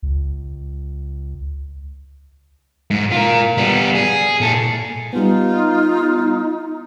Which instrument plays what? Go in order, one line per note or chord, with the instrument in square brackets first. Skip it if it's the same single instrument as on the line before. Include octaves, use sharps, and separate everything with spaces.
[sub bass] C#2
[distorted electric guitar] G#2
F4 A#4
G3 B3
G#4
A#2 A4
[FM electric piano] G3 B3 [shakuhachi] D#4 [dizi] F4